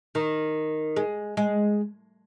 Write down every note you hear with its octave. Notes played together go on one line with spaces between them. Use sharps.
D#3
G#3
G#3